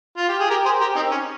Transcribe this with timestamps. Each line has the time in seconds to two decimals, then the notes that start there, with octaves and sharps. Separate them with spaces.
0.16 F4
0.28 G4
0.39 G#4
0.50 G4 A#4
0.65 G#4 C5
0.80 G4 A#4
0.95 C4 D#4
1.11 C#4